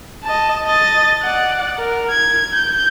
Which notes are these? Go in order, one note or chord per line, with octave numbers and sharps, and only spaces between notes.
D#5 A5
D#5 A6
D5 F#5
A#4
G#6
G6